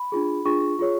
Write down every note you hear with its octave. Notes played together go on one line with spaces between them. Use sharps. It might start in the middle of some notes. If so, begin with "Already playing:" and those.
Already playing: B5
D4 F4 G#4
D4 F4 G#4 C#6
F4 G#4 C#5